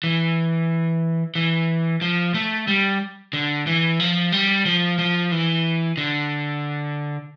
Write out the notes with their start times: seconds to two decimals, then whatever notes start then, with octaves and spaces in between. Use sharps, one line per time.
0.04 E3
1.35 E3
2.02 F3
2.34 A3
2.68 G3
3.33 D3
3.67 E3
4.00 F3
4.32 G3
4.66 F3
4.99 F3
5.32 E3
5.97 D3